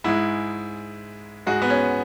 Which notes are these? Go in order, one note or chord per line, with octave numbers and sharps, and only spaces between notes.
G#2 G#3 E4
G#2 G#3 F#4
B3
C#4